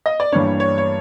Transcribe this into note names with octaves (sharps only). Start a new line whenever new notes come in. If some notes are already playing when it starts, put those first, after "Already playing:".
D#5
D5
G2 E3 G3 A#3 D4 C#5
C#5
C#5